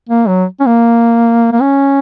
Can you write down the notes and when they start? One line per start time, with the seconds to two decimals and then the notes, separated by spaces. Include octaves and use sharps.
0.09 A#3
0.28 F#3
0.60 C#4
0.66 A#3
1.52 A#3
1.61 C#4